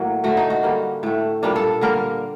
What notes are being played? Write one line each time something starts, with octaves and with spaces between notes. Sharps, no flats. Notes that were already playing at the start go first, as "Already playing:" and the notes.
Already playing: A2 F#3 A#3
D3 A3 F#4
D#4
F#4
D3 G3 A#3
A2 A3
A#2 G3 A#3 D4
A4
D3 G3 A#3 A#4